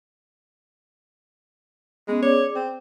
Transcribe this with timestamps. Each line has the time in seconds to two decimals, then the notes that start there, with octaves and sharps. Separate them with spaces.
2.08 G#3 B3 C#4
2.22 G#4 C#5 D5 D6
2.55 C4 G5